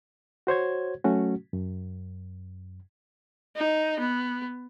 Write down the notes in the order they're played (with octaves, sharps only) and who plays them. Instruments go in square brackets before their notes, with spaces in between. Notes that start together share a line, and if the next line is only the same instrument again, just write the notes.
[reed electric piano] F#4 C5 C#5 G#6
F#3 A3 C#4 F#4
F#2
[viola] D#4
B3